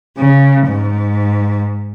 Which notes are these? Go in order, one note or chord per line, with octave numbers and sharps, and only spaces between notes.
C#3
G#2